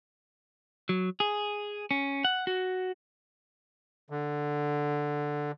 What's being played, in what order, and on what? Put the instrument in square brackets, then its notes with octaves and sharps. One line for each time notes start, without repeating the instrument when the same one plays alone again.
[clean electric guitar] F#3
G#4
C#4
F#5
F#4
[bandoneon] D3